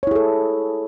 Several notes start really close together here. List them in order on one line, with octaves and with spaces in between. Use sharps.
C#5 E4 G#4 A4